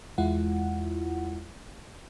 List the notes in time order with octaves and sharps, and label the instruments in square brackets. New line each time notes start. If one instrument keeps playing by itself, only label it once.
[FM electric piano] E2 G#3 E4 F4 F#5